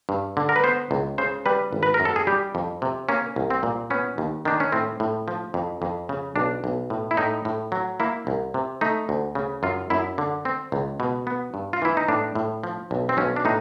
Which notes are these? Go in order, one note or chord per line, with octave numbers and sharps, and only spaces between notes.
G2
D3
A#4
B4
B3 C5
C#2
C#3 C5
G3 B4
G#1
B4
A#4
F#2
A4
G#4
G3 G4
F2
C3
A#3 C#4
C2
C4
A#2
B3 C#4
D#2
D#3 D4
C#4
A2 C4
A2
F3
F2
F2
C#3
B1 D4
B1
A2
E4
A2 D#4
A2
F#3
A#3 E4
C2
C3
A3 D#4
D2
C#3
F#2 F4
F#2 E4
D3
C4
C#2
B2
B3
G2
F4
E3 E4
D#4
A2 D4
A2
F3
B1
C4
B1 C#4
D4
A2 D#4